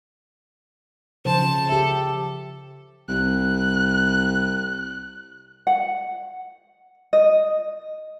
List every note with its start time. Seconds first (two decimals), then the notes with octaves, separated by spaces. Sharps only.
1.25 C#3 F3 C5 A5
1.69 G4 A4 E5
3.08 C2 F#6
5.67 F#5
7.13 D#5